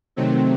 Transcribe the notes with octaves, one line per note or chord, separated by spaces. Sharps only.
C3 D#3 F#3 A3 C4